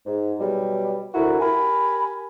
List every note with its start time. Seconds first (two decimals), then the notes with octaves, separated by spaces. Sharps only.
0.06 G#2
0.39 B2 F#3 G3
1.14 D2 E4 F#4 A#4
1.40 G4 A#4 G#5 B5